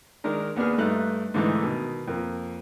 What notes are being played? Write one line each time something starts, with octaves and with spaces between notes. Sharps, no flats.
D#3 G#3 D4 A#4
D#2 B3 D4 G#4 F6
G2 A3 D#4 F#6
G#2 D3 E3 A3 D#4
B2 D#3
F2 A#3